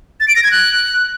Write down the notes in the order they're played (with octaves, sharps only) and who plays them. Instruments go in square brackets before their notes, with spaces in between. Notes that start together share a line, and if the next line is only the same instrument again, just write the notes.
[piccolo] A6
D7
A#6
G#6
F#6